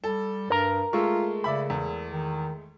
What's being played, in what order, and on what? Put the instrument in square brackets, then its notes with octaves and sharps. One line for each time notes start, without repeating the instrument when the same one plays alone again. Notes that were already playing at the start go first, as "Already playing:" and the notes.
[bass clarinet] G3 [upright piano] A4
[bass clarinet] G2 [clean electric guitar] A#4 A#5
[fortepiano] G#3 A3 A4 [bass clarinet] F4 [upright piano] C#6
[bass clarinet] C#3 [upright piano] D5 E5 B5
[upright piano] E2
[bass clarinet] D#3